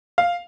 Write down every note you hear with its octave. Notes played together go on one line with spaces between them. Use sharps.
F5